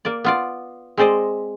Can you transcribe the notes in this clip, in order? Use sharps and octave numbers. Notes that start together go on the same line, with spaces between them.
A#3 D5
B3 F4 D5
G#3 C4 C5 D5 D#5